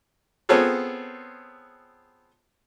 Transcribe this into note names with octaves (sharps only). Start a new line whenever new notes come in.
B3 C4 F4 G#4 A4 C#5